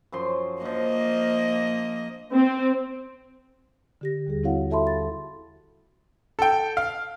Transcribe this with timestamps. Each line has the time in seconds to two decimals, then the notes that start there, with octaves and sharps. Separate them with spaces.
0.12 F#2 F3 C6
0.61 F3 A#3 D4 D#5
2.33 C4
4.01 D3 G4 A#6
4.26 D#2 G3 G#4
4.43 C4 E4 F#4 C#5 F5 F#5
4.70 F#4 A4 E5 A5 B5 C6
4.87 A6
6.39 A4 G5
6.77 F5